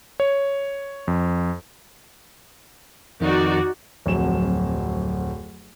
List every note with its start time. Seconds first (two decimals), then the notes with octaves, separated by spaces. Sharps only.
0.20 C#5
1.08 F2
3.21 F2 D#3 D#4 F#4 D5
4.06 D1 F2 F#3 E7